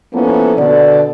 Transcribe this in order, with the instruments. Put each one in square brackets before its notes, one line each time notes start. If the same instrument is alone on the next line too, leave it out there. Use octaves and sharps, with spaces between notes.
[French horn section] F3 A#3 B3 C#4 E4 A4
B2 D3 A4 D5